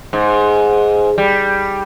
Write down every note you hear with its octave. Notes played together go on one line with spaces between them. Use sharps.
G#2
G3